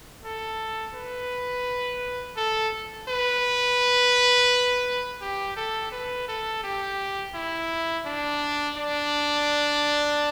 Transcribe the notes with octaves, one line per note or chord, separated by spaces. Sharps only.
A4
B4
A4
B4
G4
A4
B4
A4
G4
E4
D4
D4